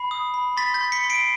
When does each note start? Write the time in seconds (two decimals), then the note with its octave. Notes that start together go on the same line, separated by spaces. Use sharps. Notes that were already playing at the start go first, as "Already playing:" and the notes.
Already playing: B5 C7
0.11 D#6
0.34 B5
0.57 C6 A6 B6
0.74 G6 A6
0.81 C6
0.92 B6 C#7
1.04 C6
1.10 C7 D7